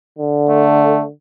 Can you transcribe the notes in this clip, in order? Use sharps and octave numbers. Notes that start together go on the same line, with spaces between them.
D3
A3